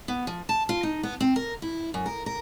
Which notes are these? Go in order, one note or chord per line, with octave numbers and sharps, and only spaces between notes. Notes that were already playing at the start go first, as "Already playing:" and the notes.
B3
F3
A5
F4
D#4
B3
C4
A#4
E4
F#2
A#4
A#4